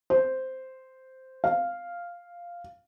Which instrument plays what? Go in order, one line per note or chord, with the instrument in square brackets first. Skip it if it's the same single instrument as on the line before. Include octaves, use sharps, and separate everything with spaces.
[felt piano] C5
F5